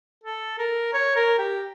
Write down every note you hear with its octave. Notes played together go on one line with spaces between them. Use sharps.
A4
A#4
C#5
A#4
G4